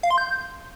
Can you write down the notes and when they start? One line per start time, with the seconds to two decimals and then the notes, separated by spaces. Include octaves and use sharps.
0.03 F5
0.10 C6
0.18 G6